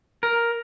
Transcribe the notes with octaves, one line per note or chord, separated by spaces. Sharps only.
A#4